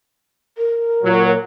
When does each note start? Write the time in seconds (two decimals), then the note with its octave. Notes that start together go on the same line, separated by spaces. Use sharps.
0.58 A#4
1.03 A#2 F#3